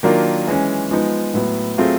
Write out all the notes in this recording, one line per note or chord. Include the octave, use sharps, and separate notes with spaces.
D#3 F#3 A#3 D4 F4
E3 G#3 C#4
F3 G#3 B3 D#4
A2 F#3 B3
F#3 A3 C4 F4 G#4